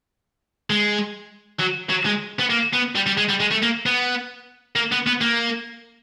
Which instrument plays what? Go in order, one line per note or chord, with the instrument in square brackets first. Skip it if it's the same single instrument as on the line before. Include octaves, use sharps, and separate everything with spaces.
[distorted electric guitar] G#3
F#3
F#3
G#3
B3
A#3
B3
G3
G3
G#3
G3
G#3
A3
A#3
B3
A#3
B3
B3
A#3